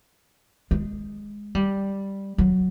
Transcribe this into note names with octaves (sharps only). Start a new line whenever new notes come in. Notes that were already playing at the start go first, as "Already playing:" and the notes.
G#3
G3
F#3